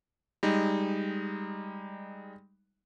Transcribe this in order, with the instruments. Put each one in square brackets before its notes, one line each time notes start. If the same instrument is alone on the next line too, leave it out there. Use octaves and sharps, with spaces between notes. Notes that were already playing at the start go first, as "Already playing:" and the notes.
[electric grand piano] G3 G#3 D#4